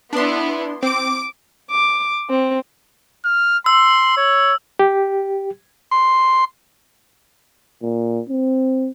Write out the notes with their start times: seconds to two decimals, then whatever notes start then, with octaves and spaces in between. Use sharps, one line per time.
0.13 B3 D4 E4 C6
0.83 C4 D6 D7
1.71 D6
2.30 C4
3.25 F6
3.66 C6 E6
4.17 C#5
4.79 G4
5.91 C6
7.83 A#2
8.30 C4